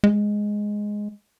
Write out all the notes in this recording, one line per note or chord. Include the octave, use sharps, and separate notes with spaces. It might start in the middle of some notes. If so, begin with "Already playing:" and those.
G#3